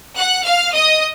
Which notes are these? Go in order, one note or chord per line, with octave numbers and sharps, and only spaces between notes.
F#5 F#6
F5 F6
D#5 D#6